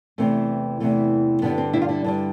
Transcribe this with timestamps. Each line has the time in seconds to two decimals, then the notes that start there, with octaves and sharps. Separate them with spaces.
0.18 E2 C3 E3 A3 C4
0.80 E2 C3 E3 A3
1.42 G2 D3 G3 B3
1.58 C4
1.73 D4 E4
1.82 F4
1.88 D4 E4
2.04 G2 D3 G3